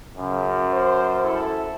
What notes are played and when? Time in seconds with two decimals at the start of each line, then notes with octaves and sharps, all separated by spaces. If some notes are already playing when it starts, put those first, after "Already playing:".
0.17 F#2 C#3
0.72 C5
1.23 E4 A4